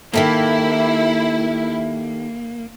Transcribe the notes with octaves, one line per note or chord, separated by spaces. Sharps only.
D#3 A#3 E4 G4 A4